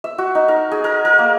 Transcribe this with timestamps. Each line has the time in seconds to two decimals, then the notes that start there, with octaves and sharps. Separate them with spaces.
0.04 E5
0.18 F#4
0.35 D#4
0.48 A#4
0.72 G#4
0.84 A#4
1.05 A#4
1.18 A#3